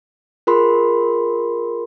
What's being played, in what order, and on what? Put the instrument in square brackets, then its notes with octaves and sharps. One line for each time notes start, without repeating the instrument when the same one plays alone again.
[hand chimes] F4 G#4 A#4 B5 C6